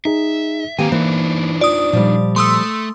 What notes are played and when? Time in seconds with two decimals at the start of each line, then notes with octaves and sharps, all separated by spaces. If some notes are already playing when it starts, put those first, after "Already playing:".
0.05 D#4 G#4 E5
0.79 D#3 A#3 C4 G4 B4 G#5 A#5
0.92 E3 A#3 D4 D#4 C5
1.61 F4 D5 D#6
1.93 A#2 F3 G3
2.36 A3 C6 D#6 E6